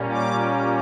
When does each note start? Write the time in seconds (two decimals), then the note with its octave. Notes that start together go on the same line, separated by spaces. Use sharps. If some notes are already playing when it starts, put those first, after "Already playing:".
Already playing: A#2 G3 A#3 C#4
0.11 D6